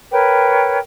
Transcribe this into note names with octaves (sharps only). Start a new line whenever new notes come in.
A#4 B4 C#5 G5